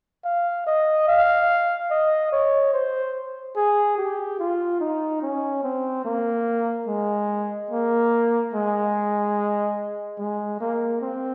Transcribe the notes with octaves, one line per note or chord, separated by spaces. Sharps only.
F5
D#5
F5
D#5
C#5
C5
G#4
G4
F4
D#4
C#4
C4
A#3
G#3
A#3
G#3
G#3
A#3
C4